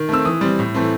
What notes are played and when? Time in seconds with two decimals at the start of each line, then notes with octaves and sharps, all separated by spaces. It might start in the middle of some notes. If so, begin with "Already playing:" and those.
Already playing: D#3
0.09 A3 C4 E6
0.25 E3 D#6
0.41 G3 C4
0.59 A2
0.75 E3 A3 C4